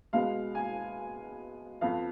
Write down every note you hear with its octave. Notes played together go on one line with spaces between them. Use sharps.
B2 G#3 B3 F5
G#5
F2 F3 B3 F5